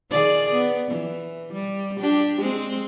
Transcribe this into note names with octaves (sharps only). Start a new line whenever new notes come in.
D#3 G#4 D5
B3
E3
G3
D4 G4
G#3 C4